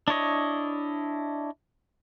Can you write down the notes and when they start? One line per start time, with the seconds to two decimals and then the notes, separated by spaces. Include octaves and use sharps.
0.08 D4 E4 C#5 D#5